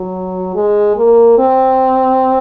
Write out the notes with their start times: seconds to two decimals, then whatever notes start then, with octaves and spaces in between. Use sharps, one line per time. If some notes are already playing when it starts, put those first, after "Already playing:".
Already playing: F#3
0.55 G#3
0.97 A#3
1.38 C4